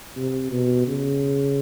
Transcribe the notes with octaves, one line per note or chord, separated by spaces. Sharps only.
C3
B2
C#3